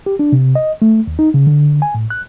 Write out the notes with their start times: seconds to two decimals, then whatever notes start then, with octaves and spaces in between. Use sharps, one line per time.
0.06 G4
0.19 D4
0.32 C3
0.55 D#5
0.82 A3
1.07 D#2
1.19 D#4
1.34 C#3
1.47 D3
1.82 G#5
1.95 A2
2.10 F#6